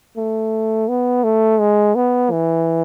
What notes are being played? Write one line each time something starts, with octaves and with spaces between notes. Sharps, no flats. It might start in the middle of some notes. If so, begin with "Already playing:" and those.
A3
B3
A3
G#3
B3
E3